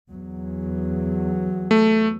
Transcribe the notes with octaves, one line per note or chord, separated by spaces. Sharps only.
E2 F#3
A3